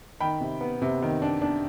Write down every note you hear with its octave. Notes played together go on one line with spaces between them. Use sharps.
D#3 G5 B5
C3
B3
C3
D#3
D4
D4